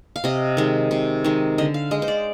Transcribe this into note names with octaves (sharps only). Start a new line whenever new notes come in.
F5
C3 D#5
D#3 G#3
C3
D#3 G#3
D3 D#5
F5
G#3 D#5
C5
D5